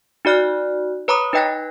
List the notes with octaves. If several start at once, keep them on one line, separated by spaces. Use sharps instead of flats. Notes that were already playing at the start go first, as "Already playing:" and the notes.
D#4 F#4 D5 F6 F#6
B4 C#5 A#5 B5 D6 D#6
D#4 B4 D#5 G5 F#6 A#6